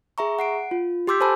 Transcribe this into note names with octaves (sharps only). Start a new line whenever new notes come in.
G#4 E5 A#5 C#6
F#5 C7 D7
F4
G4 C6 D6 E6 G6 B6
A4 C5 G#5 A5 B5 E6